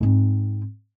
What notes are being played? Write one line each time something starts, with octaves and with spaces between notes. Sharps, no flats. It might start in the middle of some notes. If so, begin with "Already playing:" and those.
G#2 C4